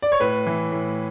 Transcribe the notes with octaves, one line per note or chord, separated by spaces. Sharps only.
D5
C#5
A2 B4
E3
A2